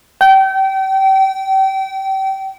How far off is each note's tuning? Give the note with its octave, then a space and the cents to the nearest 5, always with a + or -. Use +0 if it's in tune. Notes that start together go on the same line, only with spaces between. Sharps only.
G5 -30